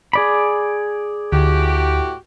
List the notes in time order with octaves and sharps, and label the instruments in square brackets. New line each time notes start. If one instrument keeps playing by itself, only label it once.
[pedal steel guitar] G#4 D5 B5
[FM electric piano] D2 [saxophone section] A2 F#4 G4